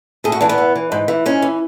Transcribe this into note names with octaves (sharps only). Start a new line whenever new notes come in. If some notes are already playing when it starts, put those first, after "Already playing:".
A2 G#4
F#4
E3 D4
B3
E3
E3
G#2
E3
G#2 C#4
E3